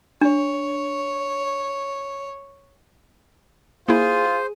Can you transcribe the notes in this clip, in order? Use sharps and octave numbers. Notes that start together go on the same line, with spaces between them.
D4 C#5
A#3 E4 F4 G#4 C5